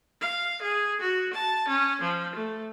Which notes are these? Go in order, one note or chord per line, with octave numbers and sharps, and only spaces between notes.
F5
G#4
F#4
A5
C#4
F3
A3